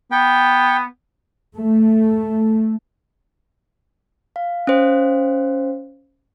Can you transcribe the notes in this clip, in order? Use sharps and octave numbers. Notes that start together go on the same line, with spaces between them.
B3 G5
A3
F5
C#4 C5 F5